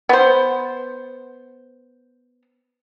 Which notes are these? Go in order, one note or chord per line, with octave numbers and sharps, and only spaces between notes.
B3 C5